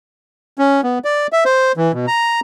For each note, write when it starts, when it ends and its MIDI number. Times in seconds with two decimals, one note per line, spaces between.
0.59 0.81 61
0.83 0.99 59
1.04 1.27 74
1.32 1.44 76
1.45 1.72 72
1.77 1.92 52
1.94 2.06 47
2.07 2.40 82